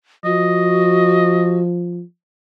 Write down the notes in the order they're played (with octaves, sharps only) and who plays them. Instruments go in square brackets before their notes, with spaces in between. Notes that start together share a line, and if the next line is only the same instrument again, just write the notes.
[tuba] F3 [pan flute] F#4 [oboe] D#5